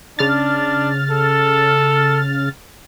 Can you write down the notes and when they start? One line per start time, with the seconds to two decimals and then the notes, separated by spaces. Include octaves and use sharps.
0.19 C#3 D4 F6 A6
1.11 A4